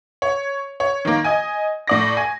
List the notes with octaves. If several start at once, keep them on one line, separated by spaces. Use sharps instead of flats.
C#5
C#5
D#3 A#3
D#5 G#5
A2 D5 A#6
G#5